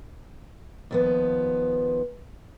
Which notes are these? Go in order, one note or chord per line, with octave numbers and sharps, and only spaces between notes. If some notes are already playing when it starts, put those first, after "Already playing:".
D#2 F3 B3